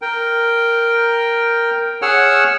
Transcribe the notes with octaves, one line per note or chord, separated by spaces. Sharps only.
A#4 G5
G#4 C#5 F#5 E6 F6